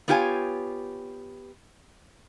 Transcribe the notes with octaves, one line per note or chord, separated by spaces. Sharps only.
B3 D4 F4 G4 C#5 G#5